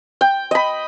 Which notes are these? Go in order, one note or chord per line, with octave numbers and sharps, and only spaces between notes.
G5
D#5 B5